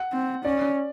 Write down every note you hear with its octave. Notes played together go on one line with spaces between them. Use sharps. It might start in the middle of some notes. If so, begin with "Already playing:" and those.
Already playing: F#5
C4
C#4 D5